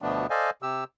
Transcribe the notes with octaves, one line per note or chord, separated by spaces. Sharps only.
D2 B2 F3 A3 B3 D4
A4 C5 D5 D#5 F5 G#5
C3 G4 E6